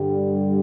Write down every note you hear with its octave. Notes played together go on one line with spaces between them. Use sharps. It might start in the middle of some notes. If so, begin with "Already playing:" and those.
Already playing: G2 D3 G3